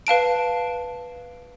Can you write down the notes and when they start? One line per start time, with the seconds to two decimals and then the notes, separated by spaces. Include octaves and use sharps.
0.07 B4 F5 A5 D7